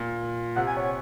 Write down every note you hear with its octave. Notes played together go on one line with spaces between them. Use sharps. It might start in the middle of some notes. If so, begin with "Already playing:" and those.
Already playing: A#2
C3 F#5
G#5
C#5